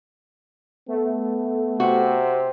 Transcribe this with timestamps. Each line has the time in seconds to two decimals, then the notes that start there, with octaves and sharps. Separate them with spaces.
0.88 A3 B3
1.80 C3 F#4